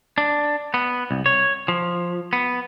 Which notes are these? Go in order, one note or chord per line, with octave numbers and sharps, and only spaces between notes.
D4
B3
C2
C#5
F3
B3